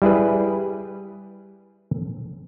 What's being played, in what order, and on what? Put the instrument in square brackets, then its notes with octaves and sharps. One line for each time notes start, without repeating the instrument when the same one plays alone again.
[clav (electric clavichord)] G3 E4 G#4 B4